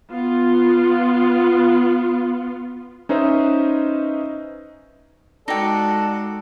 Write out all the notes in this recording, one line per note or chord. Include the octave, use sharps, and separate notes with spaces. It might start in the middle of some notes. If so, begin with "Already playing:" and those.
B3 F4
C#4 D#4 B4 C5 D#5 E5
G#3 D#4 F#4 A4 D5 G5 A5